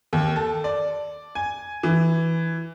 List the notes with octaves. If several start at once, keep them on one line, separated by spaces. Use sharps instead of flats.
D#2
A4
D5
G#5
E3